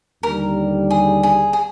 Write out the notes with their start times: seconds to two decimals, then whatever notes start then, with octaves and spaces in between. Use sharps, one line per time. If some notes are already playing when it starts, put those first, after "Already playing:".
0.23 D#2 D3 G3 A#4
0.91 G#4
1.23 G#4
1.53 G#4